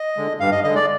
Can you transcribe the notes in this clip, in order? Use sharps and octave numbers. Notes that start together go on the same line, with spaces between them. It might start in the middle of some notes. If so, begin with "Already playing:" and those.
Already playing: D#5
D3 G#3
G2 F5
D#5
D3 G#3 D#5
D5